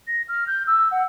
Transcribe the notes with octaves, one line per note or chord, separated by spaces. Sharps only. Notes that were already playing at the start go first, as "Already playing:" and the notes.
A#6
F6
G6
E6
F#5